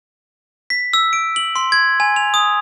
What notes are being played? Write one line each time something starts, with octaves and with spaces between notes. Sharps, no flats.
B6
E6
D7
F#7
C6
G#6
G#5
F7
D#6